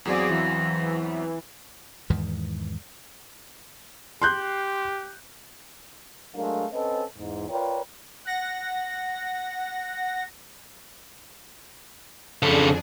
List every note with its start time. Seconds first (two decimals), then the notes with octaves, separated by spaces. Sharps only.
0.05 E2 F#3 C4 F#4 G#4 D5 F5 C6
0.29 E3
2.10 E2 G#2 D#3 E3
4.22 G4 C6 F#6 G6
6.35 F#3 G#3 A3 D4 A#4 F5
6.72 C4 C#4 A4 B4 C#5 D#5
7.17 E2 G#2
7.50 F4 A#4 B4 C#5 D5 G5
8.25 F#5 A#6
12.42 F2 C#3 D4 G#4 A4